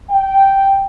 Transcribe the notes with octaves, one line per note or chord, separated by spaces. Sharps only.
G5